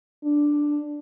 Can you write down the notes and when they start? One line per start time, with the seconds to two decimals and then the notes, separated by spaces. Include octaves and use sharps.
0.24 D4